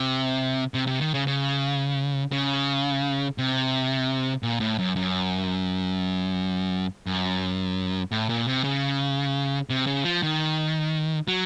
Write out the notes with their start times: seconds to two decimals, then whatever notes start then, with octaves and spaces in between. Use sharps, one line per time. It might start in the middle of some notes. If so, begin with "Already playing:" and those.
Already playing: C3
0.74 C3
0.87 C3
1.01 D#3
1.14 C#3
1.27 C#3
2.32 C#3
3.38 C3
4.43 A#2
4.60 A2
4.79 F#2
4.96 F#2
7.07 F#2
8.12 A2
8.29 A#2
8.47 C3
8.64 C#3
9.70 C3
9.87 C#3
10.04 F3
10.23 D#3
11.28 F#3